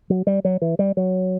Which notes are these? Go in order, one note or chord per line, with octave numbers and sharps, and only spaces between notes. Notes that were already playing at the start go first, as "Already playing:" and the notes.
F#3
G3
F#3
E3
G3
F#3